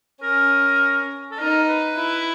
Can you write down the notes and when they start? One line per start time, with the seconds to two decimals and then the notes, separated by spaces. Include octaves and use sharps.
0.22 C#4 A#4
1.31 A4
1.39 D#4 A#4
1.68 B4
1.97 E4